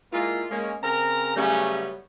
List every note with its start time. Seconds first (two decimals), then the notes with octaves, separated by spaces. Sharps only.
0.13 G#3 A#3 E4 F4
0.51 G#3 A#3 C#4
0.83 C#3 C4 A#4 A#5
1.37 C#3 F#3 G3 A3 B3 C#4